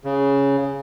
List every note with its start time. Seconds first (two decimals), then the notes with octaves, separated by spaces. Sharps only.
0.04 C#3